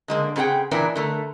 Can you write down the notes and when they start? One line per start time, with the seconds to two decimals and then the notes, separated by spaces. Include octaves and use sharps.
0.08 D3 G#3 A#3
0.36 C#3 C4 G#4 F#5 G5
0.71 A#2 E3 B3 D4 E4 A#4
0.95 D3 A3 A#4